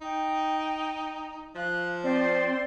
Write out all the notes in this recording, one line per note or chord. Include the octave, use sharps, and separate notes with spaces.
D#4 G5
F3 F5 F#6
C4 C5 D5 C6